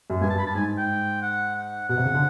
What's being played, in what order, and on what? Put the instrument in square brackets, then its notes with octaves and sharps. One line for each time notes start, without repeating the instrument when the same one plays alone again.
[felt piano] F#2
[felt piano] G2 [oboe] G#5
[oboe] A5
B5
A5
[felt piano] G#2 [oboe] G#5
[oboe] G5
F#5
F#5
[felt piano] B2 [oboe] F#5
[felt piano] C3
C#3
D3